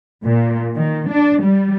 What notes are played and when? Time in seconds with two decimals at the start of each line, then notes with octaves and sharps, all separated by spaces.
0.25 A#2
0.75 D#3
1.10 D4
1.43 G3